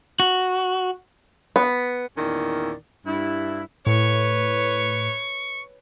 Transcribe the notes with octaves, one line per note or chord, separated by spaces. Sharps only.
F#4
B3
E2 A#2 D#3 C#4 E4 D5
G2 E4
A2 B4 C#5 C#6